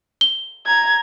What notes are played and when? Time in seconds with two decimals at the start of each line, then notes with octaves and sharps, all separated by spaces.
0.21 G7
0.67 A#5 G#6